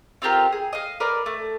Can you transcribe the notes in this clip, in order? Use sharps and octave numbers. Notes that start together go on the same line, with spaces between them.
C4 F4 G4 A#4
G#4
D#5 F5
A#4 B4 D5
A3